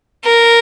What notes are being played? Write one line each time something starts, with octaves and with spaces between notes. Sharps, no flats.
A#4